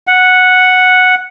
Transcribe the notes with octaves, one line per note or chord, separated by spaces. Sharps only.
F#5